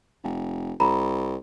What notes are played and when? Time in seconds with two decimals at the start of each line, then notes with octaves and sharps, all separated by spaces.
0.24 F1
0.80 C2 A#5 B5